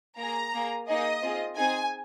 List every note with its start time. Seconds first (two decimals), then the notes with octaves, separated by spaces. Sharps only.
0.18 A#3 G#4 A#5
0.54 A#3 G#4
0.88 A#3 D#4 G#4 D#5
1.23 C4 F4 G#4
1.58 C4 D#4 G#4 G#5